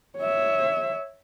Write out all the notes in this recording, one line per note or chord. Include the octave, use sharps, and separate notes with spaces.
C#5 E5